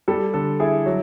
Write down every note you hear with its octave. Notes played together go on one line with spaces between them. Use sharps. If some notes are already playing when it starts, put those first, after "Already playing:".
G3 A4
D3 A4
E4 G#4
F#3